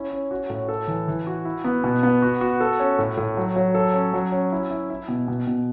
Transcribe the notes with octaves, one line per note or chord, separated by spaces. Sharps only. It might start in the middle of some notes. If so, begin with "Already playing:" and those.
Already playing: C#4 E4
C#4
F#4
A2
A4
E3
E3
F#4
E4
B3
B2
B3
F#4
F#4
A4
C#4
A2
A2
F#3
F#3
A4
C#4
F#3
C#4
E4
E4
E4
B2
B2
B2